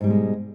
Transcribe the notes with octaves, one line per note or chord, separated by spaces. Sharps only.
G#2 B2 G3 G#3